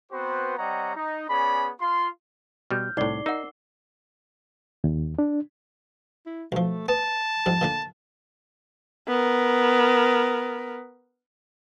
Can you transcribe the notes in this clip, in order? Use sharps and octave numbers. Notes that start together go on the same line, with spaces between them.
B3 C4 F#4 B4 C5
G3 C4 C#5 D#5 F#5 A#5
D#4
B3 C#4 G#4 D5 B5
F4 C6
B2 G3 F6 G6
C2 A2 D#4 D5 D6 C7 G7
D#4 A#4 F#5
D#2
D4
E4
B1 F3 A3
B3 A5
F2 G#2 G3
A#2 D3 D4
B3 A#4